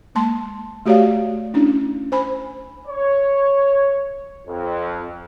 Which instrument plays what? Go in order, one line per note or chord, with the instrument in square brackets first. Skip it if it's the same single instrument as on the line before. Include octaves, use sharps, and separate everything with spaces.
[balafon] G#3 A#3 A5 C6
A3 F#4 G4 C#5 D5 F5
C#4 D4 E4
C5 G#5 B5
[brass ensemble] C#5
F2